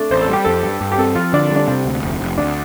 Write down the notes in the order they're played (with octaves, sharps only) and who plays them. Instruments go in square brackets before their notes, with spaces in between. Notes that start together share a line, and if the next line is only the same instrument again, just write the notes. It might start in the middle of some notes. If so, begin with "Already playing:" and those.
Already playing: [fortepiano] A3 D4
[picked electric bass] A1 [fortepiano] C5
[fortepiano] A4
[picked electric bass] G3 [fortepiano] G4
[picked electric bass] F2 [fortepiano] A4
[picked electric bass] G2
G2
[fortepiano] G4
[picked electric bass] C4 [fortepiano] A4
[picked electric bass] F3 [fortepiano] F4
[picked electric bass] D3 [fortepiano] D4
[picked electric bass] G3
[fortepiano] D4
[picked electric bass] C3 [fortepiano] C4
[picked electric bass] D2
F1
F1
[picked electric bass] D2 [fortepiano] D4